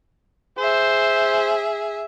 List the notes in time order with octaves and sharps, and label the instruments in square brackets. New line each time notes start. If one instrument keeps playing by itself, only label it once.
[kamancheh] G#4 E5 [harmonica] C5